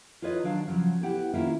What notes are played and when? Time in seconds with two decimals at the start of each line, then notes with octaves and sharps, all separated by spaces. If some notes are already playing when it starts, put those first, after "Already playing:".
0.22 F4 G#4 B4 C#5 D#5
0.43 D#3 F#3 D4 F5 A5
0.67 C#3 F3 F#3
1.01 B3 E4 G4 F#5
1.34 D#3 A#3 C#4 E4 F4